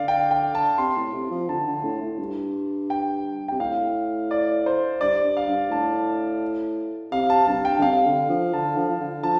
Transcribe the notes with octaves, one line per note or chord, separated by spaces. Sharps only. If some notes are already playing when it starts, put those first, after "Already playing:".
Already playing: D3 D5 F5
G5
G5
A5
C3 C6
A2
C3
F3
D3 A5
D3
A2
A2
G2
G5
C3 G5
A2 F5
D5
C5
G2 D5
G2
F5
G2
A2 A5
C3 F5
A5
G2 A5
G5
D3
C3 F5
D3
F3
D3 A5
F3
F3
D3
F3 A5